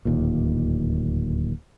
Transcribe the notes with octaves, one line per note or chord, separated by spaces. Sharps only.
D1 D#2 A#2